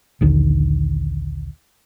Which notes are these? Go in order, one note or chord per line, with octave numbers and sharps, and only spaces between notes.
A#1 D#2 D3